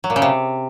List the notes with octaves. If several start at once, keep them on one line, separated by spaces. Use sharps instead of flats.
F#3
A#2
C#3
C3